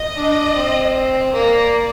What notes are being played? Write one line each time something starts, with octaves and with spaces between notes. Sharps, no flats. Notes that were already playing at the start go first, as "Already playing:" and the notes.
Already playing: D#5
D4
C4
A#3 D5